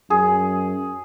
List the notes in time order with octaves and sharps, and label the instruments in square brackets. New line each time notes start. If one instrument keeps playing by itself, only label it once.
[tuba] F#2 [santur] G#4